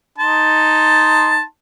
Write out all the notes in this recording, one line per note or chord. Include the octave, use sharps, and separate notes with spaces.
D#4 A5 C6